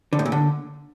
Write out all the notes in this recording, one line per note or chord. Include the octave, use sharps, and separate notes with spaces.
D3
A2
A#2
D3